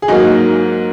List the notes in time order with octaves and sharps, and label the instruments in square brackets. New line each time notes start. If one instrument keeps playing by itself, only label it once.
[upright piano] G#4
G#2 F#3 A#3 D#4 F#4